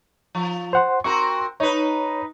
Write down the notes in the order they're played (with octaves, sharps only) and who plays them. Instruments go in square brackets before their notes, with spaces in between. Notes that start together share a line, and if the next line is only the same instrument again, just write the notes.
[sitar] F3
[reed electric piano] C5 F#5 C6
[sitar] C4 F#4 A#4 [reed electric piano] C#6
[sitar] D#4 B4 [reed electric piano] C#5